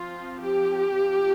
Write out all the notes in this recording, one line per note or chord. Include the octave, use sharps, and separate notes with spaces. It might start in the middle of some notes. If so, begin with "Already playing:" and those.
Already playing: F3 C4 F4
G4
F3 C4